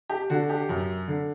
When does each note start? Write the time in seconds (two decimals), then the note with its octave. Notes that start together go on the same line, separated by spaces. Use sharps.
0.09 G4
0.30 D3 F#4
0.49 G4
0.69 F#2
1.08 D3